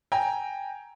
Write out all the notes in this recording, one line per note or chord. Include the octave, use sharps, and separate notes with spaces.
G5 G#5 A#5